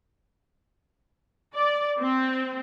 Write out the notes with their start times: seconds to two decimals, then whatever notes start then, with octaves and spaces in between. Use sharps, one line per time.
1.55 D5
2.00 C4